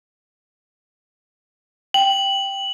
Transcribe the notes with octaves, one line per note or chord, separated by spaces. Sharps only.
G5 F#7